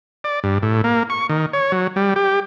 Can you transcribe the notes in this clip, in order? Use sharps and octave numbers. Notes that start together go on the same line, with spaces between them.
D5
G2
A2
A#3
C#6
D#3
C#5
F#3
G3
G4